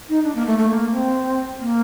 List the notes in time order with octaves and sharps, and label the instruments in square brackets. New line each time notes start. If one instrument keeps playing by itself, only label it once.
[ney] D#4
D4
A#3
A3
A3
A#3
C4
A#3